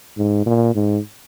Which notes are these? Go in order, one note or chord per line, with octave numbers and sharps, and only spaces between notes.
G#2
A#2
G#2